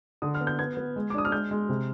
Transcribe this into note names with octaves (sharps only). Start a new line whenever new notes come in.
D3 D#6
F6
B3
G6
B3 G#6
B3
G#3
D6
D4 D#6
F6
G#3 G6
G#3
C3